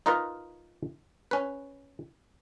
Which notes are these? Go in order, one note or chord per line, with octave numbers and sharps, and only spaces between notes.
D#4 F4 A#4 B4 D#5
C#4 B4